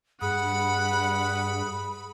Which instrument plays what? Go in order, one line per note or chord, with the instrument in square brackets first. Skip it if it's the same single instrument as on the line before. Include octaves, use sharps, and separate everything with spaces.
[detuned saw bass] G2 [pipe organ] G#4 [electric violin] F#5 [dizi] B5